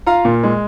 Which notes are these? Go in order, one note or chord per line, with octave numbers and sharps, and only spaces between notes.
F4 F5 A#5
A#2
G#3